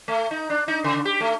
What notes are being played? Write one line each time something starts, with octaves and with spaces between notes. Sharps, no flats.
A3
D#4
D4
D#4
C#3
G4
A3